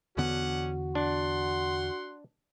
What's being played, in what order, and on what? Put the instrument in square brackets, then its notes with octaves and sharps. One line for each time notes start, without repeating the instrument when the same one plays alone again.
[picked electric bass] E2 D3 B3 [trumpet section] C#4 D4 F#5 [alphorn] F#4
[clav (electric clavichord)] D4 [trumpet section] F#5 C6